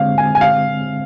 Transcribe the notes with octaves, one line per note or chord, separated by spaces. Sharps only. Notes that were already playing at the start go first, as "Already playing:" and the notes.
Already playing: D3 G#3 C4 F5
G#5
G#5
F5